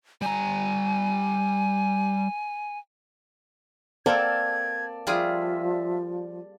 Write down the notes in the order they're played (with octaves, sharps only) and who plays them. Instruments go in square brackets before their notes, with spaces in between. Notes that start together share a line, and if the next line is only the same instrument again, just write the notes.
[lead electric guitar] G3 A#5 [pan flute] G#5
[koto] A#3 C4 A4 [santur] D5 A5 [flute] G#6
[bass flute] F3 [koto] G3 F4 G#4 [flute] E5